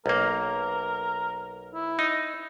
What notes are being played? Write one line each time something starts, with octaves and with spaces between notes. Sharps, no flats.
B1 A#3 A#4
E4
D#4